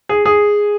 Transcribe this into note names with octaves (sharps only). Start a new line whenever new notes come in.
G#4
G#4